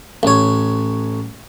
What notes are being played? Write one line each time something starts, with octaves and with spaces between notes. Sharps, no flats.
A1 C#5